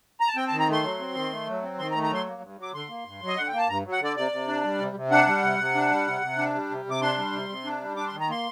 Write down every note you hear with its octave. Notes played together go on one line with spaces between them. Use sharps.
A#5
A5
C4 G5
A5
D#3
A#5
A3 C6
F#3
C4
D#3
A3
F#3
C4
D#3 C6
A#5
A3
A#5
F#3 C6
A#3
G2
F#3
D6
D3 C6
A#3
G2
F#3
D#5
D3 F#5
G5
A#3 A5
G2 A#5
F#3
F#5
D3 D5
C3 D5
C3
D4
G3
C3
C3
D4 F#5
G3
C3
C3
D4
G3
C3
C3
D4
G3
C3
C3
D6
D4 C6
G3
C3
C3
D4
G3
D4 D6
C6
D#3
A#5
A#3 C6